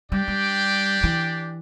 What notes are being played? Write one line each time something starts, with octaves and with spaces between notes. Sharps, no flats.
G3 D4 G4 D5 G5
G3
E3